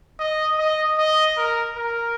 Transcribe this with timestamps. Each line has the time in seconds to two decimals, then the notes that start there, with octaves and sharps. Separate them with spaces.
0.19 D#5
0.58 D#5
0.98 D#5
1.37 A#4
1.77 A#4